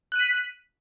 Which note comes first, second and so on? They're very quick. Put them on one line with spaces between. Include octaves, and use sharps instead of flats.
F#6 D#7 B6